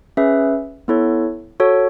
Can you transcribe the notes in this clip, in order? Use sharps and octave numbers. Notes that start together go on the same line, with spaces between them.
C#4 G#4 B4 E5
B3 E4 A4 C#5
F#4 A4 C#5